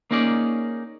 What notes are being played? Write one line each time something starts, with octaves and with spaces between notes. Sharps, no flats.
A#3 C#4 D#4 G#4 D5